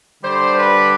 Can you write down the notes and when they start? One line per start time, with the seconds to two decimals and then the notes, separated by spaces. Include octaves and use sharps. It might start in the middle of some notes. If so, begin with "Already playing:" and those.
0.23 D3 G3 C5
0.56 B4